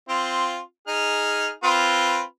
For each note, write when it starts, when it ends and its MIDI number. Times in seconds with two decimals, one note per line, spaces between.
0.08 0.58 60
0.08 0.58 65
0.88 1.50 63
0.88 1.50 68
0.88 1.50 89
1.63 2.21 60
1.63 2.21 65
1.63 2.21 71